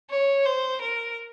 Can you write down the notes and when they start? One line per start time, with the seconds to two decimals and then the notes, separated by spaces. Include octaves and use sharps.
0.10 C#5
0.45 C5
0.82 A#4